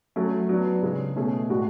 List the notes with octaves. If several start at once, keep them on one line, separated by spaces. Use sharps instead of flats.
F#3 A3 C#4
F#3 B3 D4
C#3 G#3 C#4 G#4
B2 A3 C#4 G#4
A2 G#3 D4 F#4